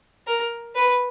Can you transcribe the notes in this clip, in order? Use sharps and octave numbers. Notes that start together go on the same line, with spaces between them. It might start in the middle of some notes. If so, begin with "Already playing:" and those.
A#4
B4